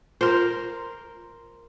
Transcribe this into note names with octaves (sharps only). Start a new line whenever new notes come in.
F4 A#4 C5